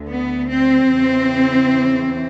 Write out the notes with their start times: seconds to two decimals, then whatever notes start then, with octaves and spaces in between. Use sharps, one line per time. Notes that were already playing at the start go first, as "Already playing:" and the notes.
Already playing: D2 D3
0.08 B3
0.49 C4
0.91 E2 C#3 E3